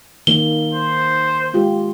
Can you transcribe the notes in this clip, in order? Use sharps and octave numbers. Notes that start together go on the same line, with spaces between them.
D#3 A#3 G7
C5
G#3 F4 G4